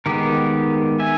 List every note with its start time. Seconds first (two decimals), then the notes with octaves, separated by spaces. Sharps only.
0.06 D#3 G#3 B3 G4 A#4
1.00 E5 G#5